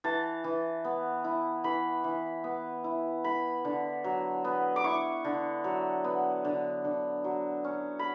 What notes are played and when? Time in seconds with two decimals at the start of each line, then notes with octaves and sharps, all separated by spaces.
0.04 E3 A5
0.44 E3
0.85 B3
1.24 E4
1.64 E3 B5
2.04 E3
2.44 B3
2.84 E4
3.24 E4 B5
3.65 D3
4.04 F#3
4.44 B3
4.76 D6
4.84 E4 C#6
5.24 D3
5.64 F#3
6.04 B3
6.45 D3
6.84 D3
7.24 F#3
7.64 C#4
7.99 B5